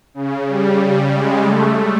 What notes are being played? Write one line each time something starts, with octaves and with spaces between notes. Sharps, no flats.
C#3
G3
G#3
A3